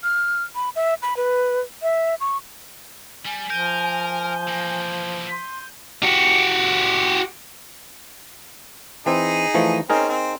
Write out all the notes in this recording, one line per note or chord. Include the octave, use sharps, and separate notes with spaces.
F6
B5
E5
B5
B4
E5
C#6
G3 G#5
F3 A#4 G6 D#7 G7
E3 A#3
C6
F#4 G4
E3 C4 D#4 G#4
E3 F3 A3
C4 C#4 D#4 G#4 A#4
C4